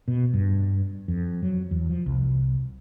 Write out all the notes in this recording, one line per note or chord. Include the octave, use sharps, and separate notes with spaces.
B2
G2
F2
F#3
E2
F3
C2